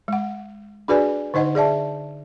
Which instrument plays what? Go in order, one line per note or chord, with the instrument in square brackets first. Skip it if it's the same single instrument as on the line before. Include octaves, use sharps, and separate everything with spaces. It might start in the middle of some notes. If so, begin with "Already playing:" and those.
[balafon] G#3 F#5
D4 F#4 G#4 B4 D5 G#5
D3 D#4 C5 D#5 F#5
G#4 D5 E5 A5